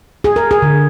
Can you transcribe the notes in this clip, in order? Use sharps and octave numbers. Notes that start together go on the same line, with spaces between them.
G#4
A#4
G#4
D3